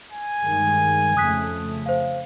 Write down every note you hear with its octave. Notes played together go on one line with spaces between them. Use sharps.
G#5
G2 D#3 G#3
F2 C#3 A3 D#6 F#6 B6
C5 F5